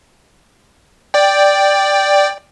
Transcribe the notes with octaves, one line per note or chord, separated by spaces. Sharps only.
D5 G5